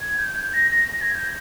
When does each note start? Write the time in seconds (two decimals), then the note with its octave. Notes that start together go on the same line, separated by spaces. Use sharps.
0.01 G#6
0.18 G6
0.36 G6
0.53 A#6
0.71 A#6
0.88 A#6
1.01 G#6
1.15 G6